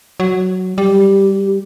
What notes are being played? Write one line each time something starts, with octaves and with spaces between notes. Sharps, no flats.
F#3
G3 G4